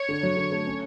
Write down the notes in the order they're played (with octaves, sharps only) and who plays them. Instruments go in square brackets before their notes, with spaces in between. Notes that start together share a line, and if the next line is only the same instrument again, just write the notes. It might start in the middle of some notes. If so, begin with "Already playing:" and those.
Already playing: [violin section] C#5
[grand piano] D3
F#3
D3
A3
C#4